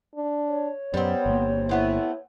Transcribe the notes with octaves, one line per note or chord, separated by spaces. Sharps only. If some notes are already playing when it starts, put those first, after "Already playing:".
D4
C#5
F#2 G3 B3 C4
G1 A#3
A3 B3 C4 E4